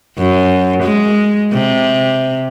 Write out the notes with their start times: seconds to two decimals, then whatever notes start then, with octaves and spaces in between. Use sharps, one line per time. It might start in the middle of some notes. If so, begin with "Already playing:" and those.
0.18 F#2
0.82 G#3
1.52 C3